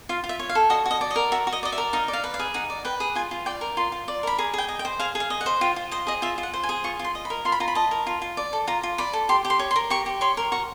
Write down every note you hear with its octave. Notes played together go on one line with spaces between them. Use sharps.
F4 F5
F4
E5
C#5
F5
A4
F#4 D#5
F#4
D#5
D5
D#5
A#4
F#4 E5
F#4
D#5
D5 D#5
E5
A#4
D#4 F5
D5
F5
B4
F5
G#4
D#4 F#5
D5
B4 G5
G#4
F4 G#5
F4
D5 G5
A#4
F4 C6
F4
D5
A#4 B5
G#4 A#5
G#4 G5
D#5
G5
C5
G#4 F5
G#4
F5
D#5
F#5
C5
F4 G5
F4
C5 D#5
G#4 D#5
F4 E5
F4
F#5
C5
G#5
G#4
F4 C#6
F4
C6
D#5
B5
A#4
F4 C6
B5
F4 A#5
B5
D#5 A5
A#4
F4
F4
D5
A4
F4 A#5
F4
D5 B5
A4
G4 C6
G4
C6
C#5
C6
A#4
G4 C#6
G4
C#5 C6
A#4
F#4 C#6